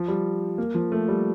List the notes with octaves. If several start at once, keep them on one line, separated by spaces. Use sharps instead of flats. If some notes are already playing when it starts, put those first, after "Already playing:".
Already playing: F3
G3
A#3
F3
A3
G3